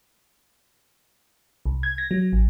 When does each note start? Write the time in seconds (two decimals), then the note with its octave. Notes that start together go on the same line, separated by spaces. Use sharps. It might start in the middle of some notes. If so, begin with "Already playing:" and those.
1.66 C2
1.83 G#6
1.98 A#6
2.11 F#3
2.33 A1